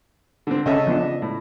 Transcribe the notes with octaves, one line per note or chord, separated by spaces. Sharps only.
D3 C4
C#3 C#4 A4 D#5 E5
F3 B3 D4
A2